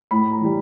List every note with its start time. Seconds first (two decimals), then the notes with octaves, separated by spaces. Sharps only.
0.11 A2 B5
0.31 A#5
0.41 E3 G3